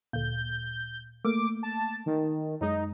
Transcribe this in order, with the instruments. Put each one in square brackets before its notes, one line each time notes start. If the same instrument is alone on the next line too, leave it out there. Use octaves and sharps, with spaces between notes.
[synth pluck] D2 A#2 [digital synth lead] G6
[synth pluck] A3 A#3 [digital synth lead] D6
[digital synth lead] A5
D#3
[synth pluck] F#2 G#3 [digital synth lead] D#4